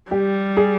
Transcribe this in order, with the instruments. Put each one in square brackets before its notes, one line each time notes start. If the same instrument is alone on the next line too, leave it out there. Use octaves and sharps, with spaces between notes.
[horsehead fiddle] G3 [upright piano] G4
[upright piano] G#4